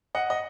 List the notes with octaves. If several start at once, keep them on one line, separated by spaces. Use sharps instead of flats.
D#5 F#5
D#5